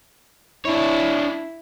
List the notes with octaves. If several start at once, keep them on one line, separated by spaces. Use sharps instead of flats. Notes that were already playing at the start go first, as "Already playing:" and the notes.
D4 E4 C#5